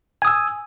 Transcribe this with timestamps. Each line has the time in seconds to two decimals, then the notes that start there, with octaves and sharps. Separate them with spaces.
0.22 G#5
0.25 D#6
0.27 E6